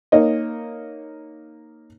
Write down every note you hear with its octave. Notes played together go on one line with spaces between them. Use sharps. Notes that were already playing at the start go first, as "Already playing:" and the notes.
A#3 D#4 C#5 D#5